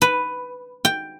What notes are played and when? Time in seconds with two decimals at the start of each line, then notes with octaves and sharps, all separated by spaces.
0.02 B4
0.85 G5